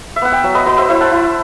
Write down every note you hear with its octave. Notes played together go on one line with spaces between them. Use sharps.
E5
B3 F#5
E5 G5
F#3
B4 D#5
F#3 B4 D#5
C5 E5
E4 C5 E5
F#5 A5
E4